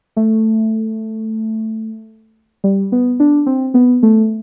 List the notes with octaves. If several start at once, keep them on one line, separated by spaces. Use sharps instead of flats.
A3
G3
B3
D4
C4
B3
A3